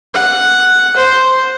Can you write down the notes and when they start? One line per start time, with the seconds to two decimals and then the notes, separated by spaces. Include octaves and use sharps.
0.14 F#5
0.96 C5